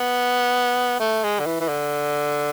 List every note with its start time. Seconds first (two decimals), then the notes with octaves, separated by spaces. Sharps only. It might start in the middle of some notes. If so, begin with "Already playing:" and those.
Already playing: B3
1.00 A3
1.24 G#3
1.39 D3
1.46 E3
1.60 E3
1.68 D3